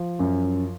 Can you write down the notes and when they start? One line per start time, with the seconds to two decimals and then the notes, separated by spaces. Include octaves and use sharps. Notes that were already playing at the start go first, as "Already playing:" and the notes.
Already playing: F3
0.19 F#2